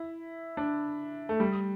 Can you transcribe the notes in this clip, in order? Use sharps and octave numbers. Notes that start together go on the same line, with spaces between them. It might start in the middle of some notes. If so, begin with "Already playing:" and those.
Already playing: E4
D4
A3
G3